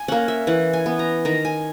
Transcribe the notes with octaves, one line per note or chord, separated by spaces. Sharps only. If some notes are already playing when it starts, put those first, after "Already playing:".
Already playing: G#5
A#3 C#4 F#5
E5
E3 F#5
G#5
B3
A#5
D#3 A#5
G#5